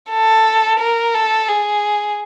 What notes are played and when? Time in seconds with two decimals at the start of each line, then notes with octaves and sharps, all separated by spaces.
0.10 A4
0.80 A#4
1.14 A4
1.49 G#4